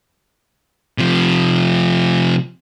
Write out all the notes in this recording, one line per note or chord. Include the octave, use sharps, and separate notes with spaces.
C3 F3